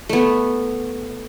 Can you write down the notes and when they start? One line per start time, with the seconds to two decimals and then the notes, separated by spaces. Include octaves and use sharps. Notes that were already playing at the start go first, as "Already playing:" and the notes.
0.09 A3 B3